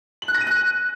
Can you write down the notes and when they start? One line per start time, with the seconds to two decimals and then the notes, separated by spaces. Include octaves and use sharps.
0.22 F#7
0.28 F#6
0.34 A#6
0.41 D#7
0.47 F#6